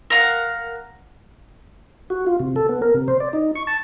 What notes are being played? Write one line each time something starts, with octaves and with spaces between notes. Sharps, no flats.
A#4 F5 F#5
F#4
F4
C3
A4
B3
A#4
C3
C5
D5
D#4
C#6
A5